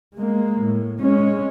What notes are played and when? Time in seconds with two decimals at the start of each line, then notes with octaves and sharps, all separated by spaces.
0.15 G#3 A#3
0.61 A2
1.01 G#3 C#4